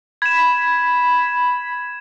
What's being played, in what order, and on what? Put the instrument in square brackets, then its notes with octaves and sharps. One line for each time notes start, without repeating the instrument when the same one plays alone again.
[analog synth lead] B5 [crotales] G#6 E7